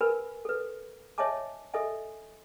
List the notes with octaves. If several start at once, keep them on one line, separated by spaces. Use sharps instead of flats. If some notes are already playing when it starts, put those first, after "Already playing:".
A#4 B4 G#5 B5
A4 B4
C#5 D#5 E5 G#5 A5 D6
A4 D#5 E5 G#5